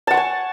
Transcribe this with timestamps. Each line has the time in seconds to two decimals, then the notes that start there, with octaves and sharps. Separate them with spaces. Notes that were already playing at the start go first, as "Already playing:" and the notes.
0.07 A5
0.11 F#5
0.14 C#6
0.17 G#5